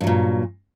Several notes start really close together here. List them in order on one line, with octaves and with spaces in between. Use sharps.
G2 F#3 A#2